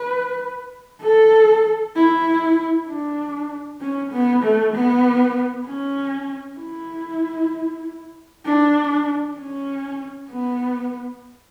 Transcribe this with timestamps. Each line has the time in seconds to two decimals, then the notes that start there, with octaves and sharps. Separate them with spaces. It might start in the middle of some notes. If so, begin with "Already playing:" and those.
Already playing: B4
1.02 A4
1.96 E4
2.88 D4
3.81 C#4
4.12 B3
4.43 A3
4.73 B3
5.66 C#4
6.59 E4
8.45 D4
9.37 C#4
10.30 B3